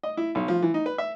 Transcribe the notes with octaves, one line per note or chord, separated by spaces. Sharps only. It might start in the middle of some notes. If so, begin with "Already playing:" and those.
D#5
E4
B1
F3
E3
D#4
B4
E5